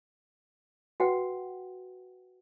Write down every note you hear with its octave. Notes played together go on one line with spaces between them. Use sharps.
F#4 B4 F#5 G5